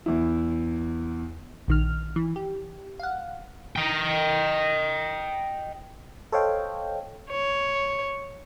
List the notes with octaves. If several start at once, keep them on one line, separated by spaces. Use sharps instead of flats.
E2 E4
A#1 D#3 F6
E3
G4
F5 F#5
D#5 G5
A4 C5 C#5 D#5 F5 G5
C#5